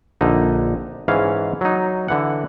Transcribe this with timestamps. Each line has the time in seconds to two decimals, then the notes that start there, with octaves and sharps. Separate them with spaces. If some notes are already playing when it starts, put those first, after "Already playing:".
0.21 A#1 D3 D#4
1.08 G#2 E3 C#4 F5
1.61 F#3 D#4
2.08 D3 E3 F#5